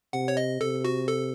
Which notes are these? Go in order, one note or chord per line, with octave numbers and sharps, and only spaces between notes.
C3 F#5
C#5
D#5
C3 A4
F#4
A4